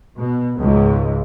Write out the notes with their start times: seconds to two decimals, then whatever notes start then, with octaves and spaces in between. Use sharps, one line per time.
0.19 B2
0.57 C#2 G#2